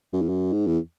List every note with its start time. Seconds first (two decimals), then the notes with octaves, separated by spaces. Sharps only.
0.14 F#2
0.22 E2
0.29 F#2
0.53 G#2
0.67 E2